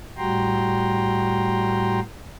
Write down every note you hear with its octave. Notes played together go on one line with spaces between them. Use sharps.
A2 G3 F#4 G5 A#5 C6